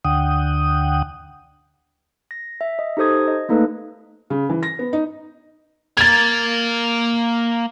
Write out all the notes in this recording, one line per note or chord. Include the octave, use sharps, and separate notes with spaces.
D2 D3 F#5 G5 D#6
A#6
E5
D#5
D#4 G4 A4 C5 D#6 G#6
D#5
A3 A#3 D#4 A4 B4
C#3
E3
A#6
B3
D#4
A#3 A#4 G#6 A6